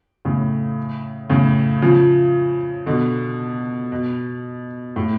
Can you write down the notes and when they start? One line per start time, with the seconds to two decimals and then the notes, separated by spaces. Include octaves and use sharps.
0.25 A2 C#3
1.30 A2 C#3
1.82 C#3 F3
2.86 B2 D3
3.92 B2
4.96 A2